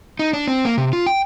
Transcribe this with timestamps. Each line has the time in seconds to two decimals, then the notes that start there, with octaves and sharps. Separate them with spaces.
0.19 D#4
0.33 D4
0.48 C4
0.65 A#3
0.78 C3
0.93 F4
1.06 G5